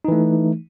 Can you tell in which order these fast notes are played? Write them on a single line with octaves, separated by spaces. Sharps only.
D#4 E3 A3